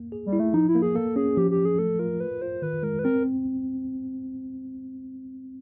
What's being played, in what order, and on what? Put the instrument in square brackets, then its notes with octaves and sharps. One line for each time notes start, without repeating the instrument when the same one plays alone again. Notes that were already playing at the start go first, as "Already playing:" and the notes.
Already playing: [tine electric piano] A#3
G#4
[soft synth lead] G3
[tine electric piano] E4
[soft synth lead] A3
[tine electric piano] F3 [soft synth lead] D#4
[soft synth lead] E4
[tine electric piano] A#3
[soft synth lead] G#4
[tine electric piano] A#3 [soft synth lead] A4
[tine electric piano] C#4 [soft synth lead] G#4
[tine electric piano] F3 [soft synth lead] G4
[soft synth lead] G4
[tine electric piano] F3
[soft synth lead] G#4
[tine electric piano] A3 [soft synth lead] A4
[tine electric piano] F4 [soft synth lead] A#4
[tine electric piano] A#4 [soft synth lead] B4
[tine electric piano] F4 [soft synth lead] C5
[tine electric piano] D#3 [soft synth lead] B4
[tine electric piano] G#3 [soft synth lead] A#4
[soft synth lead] B4
[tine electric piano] C4 [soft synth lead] A#4